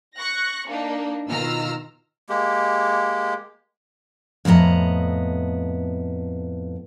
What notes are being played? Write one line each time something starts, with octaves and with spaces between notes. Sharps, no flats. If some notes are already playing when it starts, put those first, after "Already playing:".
C#6 F#6 A#6
A#3 D4 D#4
B2 D#3 F4 A#5 E6 F6
G#3 A#3 G4
F2 A2 B3 D#5 A#5